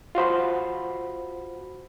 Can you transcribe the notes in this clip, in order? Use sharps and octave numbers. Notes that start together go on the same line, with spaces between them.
F4 F#4 C5 B5